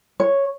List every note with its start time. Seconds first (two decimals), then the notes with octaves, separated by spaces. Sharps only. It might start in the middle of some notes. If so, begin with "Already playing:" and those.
0.20 C#5